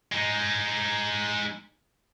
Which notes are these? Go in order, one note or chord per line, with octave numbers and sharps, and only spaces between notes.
G#3 D#4